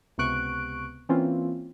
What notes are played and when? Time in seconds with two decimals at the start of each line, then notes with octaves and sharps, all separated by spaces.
0.18 C#2 C3 B3 C#6 F#6 D7
1.09 E3 A#3 C4 C#4 F4